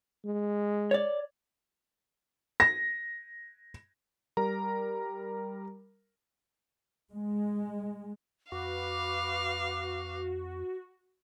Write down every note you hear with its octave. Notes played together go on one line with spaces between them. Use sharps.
G#3
C#5 D5
A#6
G3 A#4 A#5
G#3
F2 F#4 B4 F5 D6